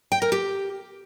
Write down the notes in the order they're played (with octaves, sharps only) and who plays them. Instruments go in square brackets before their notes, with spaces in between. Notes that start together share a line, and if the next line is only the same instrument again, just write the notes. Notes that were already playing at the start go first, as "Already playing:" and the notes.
[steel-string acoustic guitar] G5
A#4
G4